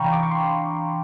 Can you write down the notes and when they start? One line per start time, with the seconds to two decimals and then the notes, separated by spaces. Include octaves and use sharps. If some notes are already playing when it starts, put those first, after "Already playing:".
Already playing: C3 E3 D4 F5 G5 A#5 B5 C#6
0.13 D6
0.23 C#6
0.31 C6